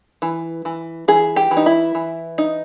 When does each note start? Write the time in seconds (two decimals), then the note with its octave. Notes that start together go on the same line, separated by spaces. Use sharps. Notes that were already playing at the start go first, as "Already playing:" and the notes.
0.22 E3
0.65 E3
1.08 E3 G#4
1.36 G4
1.51 E3
1.57 D#4
1.66 E4
1.95 E3
2.38 D#4